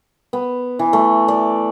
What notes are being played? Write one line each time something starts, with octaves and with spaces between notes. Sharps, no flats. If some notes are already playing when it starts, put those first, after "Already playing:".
B3
E3
A3
D5